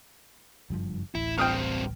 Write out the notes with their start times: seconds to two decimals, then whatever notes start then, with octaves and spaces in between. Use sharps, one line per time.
0.70 F#1 G2 F3
1.15 D1 A1 E4
1.38 G2 C4 G5 D#6 F6